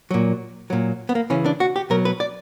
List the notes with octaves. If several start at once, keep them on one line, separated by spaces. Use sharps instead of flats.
A#2 F#3
A#2 F#3
B3
A#3
C#3 E3 C#4
D4
F#4
G4
B2 F#3 A#4
B4
D5